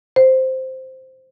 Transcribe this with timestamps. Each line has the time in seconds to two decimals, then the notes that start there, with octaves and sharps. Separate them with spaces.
0.16 C5